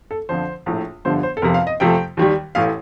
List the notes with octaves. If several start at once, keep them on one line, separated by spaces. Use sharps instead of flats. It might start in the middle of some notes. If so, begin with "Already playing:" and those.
A4
F2 D3 F3 C5
A#1 A2 A3
G1 G2 D3 F3 C5
C5
A4
F1 F2 C3 F3 A#4
F5
D#5
F2 C3 F3 A3 G5
D#2 D#3 G3
A1 A2 A3 F5